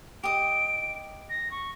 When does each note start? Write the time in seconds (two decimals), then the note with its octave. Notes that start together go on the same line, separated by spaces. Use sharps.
0.24 G4 D#5 D7
1.30 A#6
1.51 C#6